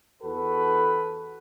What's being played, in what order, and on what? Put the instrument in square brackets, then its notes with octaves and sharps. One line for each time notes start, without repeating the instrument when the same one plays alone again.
[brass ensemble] E2 F#4 A4 B4